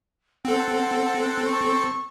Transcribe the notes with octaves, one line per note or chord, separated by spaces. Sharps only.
C4 A4 F#5
F#6
C#6